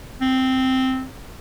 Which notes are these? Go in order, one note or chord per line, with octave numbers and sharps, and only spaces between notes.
C4